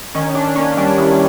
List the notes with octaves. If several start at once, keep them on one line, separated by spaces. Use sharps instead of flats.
D#3 C#4
D#3 D4
A#3 C#4
G3 D4
D#3 E4